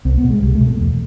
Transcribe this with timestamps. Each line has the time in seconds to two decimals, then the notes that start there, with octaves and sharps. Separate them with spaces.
0.05 C2 C4
0.18 B3
0.24 B2
0.30 G#3
0.43 C2 G3
0.55 A3
0.61 B2
0.67 A3
0.80 E2